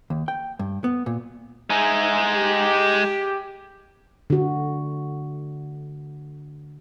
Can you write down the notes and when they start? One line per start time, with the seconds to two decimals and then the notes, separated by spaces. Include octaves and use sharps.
0.10 D#2
0.28 G5
0.59 G2
0.84 B3
1.06 A#2
1.70 G#3 D#4 G#4 E5 G#5
2.36 G4
4.30 D3 F#4